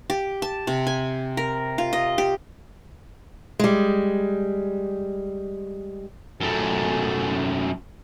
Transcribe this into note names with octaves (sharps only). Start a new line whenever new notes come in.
G4
A5
C3
G#5
A#4
F4
D#5
G4
G3 G#3
F#2 A3